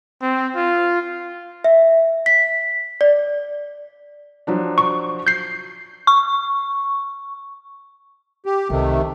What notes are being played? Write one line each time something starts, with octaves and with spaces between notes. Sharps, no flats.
C4
F4
E5
B6
D5
F3 F#3 D4
C#6
G6 C7
C#6
G4
C2 C3 D#3 A3